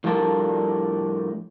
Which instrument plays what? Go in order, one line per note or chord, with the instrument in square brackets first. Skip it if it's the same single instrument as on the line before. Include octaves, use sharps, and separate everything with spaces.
[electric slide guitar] A2 F3 G3 D4 A4 A#4